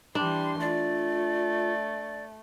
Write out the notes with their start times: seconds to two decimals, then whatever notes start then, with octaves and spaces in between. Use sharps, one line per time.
0.15 E3 G3 D4 C6
0.61 A3 F4 D5